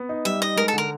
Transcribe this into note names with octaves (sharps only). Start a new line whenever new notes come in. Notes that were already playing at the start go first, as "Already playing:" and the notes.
Already playing: B3
D#4
G3 E5
D#4 D#5
G#3 A#4
A4
D3 A#4